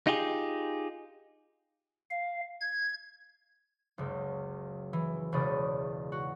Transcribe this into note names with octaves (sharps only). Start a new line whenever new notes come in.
D#4 F4 G4 G#4
F5
G#6
F#1 C#2
E3
E1 C#2 C#3 D5 B5 D#6
F#4